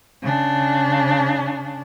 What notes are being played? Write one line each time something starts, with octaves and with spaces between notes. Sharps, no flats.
C#3 D4